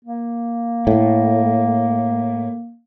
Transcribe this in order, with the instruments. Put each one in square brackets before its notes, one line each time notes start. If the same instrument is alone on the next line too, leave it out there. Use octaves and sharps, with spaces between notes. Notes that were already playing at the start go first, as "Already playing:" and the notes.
[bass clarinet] A#3
[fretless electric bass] A2